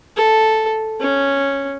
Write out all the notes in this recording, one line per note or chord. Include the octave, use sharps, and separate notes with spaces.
A4
C#4